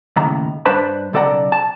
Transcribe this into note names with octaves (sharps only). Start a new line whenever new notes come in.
D#2 A2 C#3 A#5
G2 D4 B4 C5 A5 B5
B1 C#3 A4 D5 F#5 A#5
A5